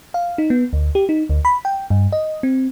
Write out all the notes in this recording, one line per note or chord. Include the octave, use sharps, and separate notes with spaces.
F5
D#4
B3
D2
G4
D#4
D2
B5
G5
G2
D#5
C4